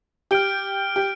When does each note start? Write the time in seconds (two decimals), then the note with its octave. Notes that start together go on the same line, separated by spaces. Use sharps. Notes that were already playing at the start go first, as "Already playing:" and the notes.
0.31 G4 F6 D7 G7
0.96 G4